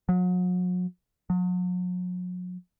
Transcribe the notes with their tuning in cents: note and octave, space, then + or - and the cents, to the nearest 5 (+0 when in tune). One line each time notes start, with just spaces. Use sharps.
F#3 -40
F#3 -40